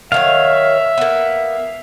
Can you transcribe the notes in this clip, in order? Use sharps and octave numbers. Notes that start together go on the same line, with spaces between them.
D#3 F#3 C#5 E5 F5
A#3 B3